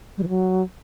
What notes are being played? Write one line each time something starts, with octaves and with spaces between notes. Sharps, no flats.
G3
E3
F#3